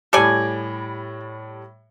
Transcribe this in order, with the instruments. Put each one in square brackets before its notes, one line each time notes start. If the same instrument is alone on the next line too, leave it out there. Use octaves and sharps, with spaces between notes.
[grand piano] A2 G3 [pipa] A4 D5 G#5